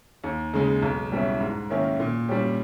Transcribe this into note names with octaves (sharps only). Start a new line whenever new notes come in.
D#2
C#3 G#3
B1
B2 G3 C#4 E4
G#2
D#3 A#3 C#4 E4
A#2
G3 C#4 G4